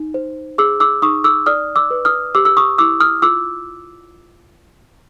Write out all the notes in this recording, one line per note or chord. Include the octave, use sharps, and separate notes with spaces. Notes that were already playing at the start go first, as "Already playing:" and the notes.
Already playing: D#4
C5
G#4 D6 E6
D6 E6
D#4 C#6 D#6
D6 E6
D5 D#6 F6
D6 E6
B4
D#6 F6
G4 D6 E6
E6
C#6 D#6
E4 D6 E6
D#6 F6
F4 D6 E6